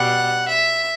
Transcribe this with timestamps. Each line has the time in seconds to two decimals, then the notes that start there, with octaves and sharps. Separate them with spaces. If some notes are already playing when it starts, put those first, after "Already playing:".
Already playing: B2 G3 F#5
0.48 E5